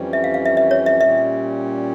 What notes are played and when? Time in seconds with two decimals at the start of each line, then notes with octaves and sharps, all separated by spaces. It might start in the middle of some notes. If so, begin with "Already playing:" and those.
Already playing: F2 E3 G3 C#4
0.13 E5
0.24 F5
0.34 F5
0.45 E5
0.57 E5
0.71 C#5
0.86 E5
1.01 A#2 G3 C#4 E5